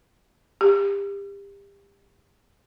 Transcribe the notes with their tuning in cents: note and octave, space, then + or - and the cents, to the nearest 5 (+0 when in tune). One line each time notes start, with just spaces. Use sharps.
G4 +30